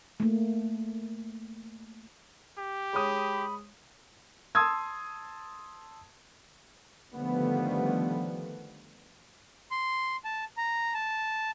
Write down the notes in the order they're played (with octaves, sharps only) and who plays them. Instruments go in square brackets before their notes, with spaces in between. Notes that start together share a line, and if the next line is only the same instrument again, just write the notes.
[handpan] A3 A#3
[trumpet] G4
[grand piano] G#3 C#5 D#6 [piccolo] B5
[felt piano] A5 C6 D#6 E6 G#6
[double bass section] D3 D#3 F3 G3 A3 B3
[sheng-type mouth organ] C6
A5
A#5
A5